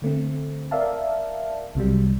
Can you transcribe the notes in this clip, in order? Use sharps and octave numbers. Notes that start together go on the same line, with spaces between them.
D3 A3 C4
A#4 D5 E5 F5 A5
C2 C3 F#3 G3